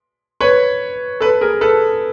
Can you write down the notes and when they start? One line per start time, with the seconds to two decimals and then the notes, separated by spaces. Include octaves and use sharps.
0.40 B4 C#5
1.20 A4 B4
1.41 G#4 A#4
1.61 A4 B4